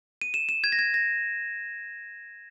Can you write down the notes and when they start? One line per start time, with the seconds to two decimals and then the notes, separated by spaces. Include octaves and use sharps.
0.21 D#7
0.34 E7
0.49 E7
0.64 G#6
0.72 A#6
0.79 G#6
0.94 A#6